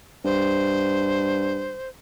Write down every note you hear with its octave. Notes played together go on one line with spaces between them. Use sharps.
G2 C5